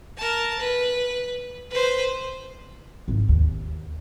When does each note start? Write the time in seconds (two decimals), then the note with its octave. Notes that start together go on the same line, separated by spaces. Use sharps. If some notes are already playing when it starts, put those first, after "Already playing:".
0.17 A#4 A5
0.59 B4
1.70 B4 C5
3.08 G#1
3.29 D#2